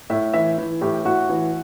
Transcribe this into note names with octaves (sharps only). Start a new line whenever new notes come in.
A2 E5
E3 E5
E3
A2 G4
A2 F#4
E3